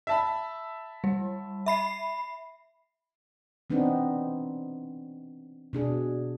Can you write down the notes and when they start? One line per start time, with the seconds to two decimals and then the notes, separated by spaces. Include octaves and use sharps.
0.07 E5 A5 B5
1.04 G3
1.66 E5 B5 C7
3.70 E3 B3 C4 D4 D#4
5.73 B2 D4 G#4